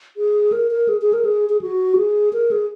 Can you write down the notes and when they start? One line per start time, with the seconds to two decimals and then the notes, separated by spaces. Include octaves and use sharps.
0.17 G#4
0.52 A#4
0.71 A#4
0.89 G#4
1.02 G#4
1.13 A#4
1.25 G#4
1.49 G#4
1.61 F#4
1.97 G#4
2.33 A#4
2.51 G#4